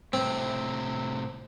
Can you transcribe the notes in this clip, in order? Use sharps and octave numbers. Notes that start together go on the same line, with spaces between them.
A2 C3 C4